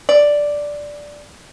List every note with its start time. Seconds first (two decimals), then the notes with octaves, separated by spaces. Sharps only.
0.09 D5